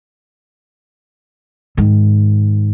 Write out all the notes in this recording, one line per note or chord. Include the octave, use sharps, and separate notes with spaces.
G#2 D#3